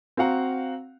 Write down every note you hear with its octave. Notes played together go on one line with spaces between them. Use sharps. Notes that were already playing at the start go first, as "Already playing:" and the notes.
C4 F#4 F5 F#5 A#5